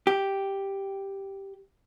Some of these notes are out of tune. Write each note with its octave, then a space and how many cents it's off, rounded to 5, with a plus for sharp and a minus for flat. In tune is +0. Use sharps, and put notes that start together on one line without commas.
G4 +0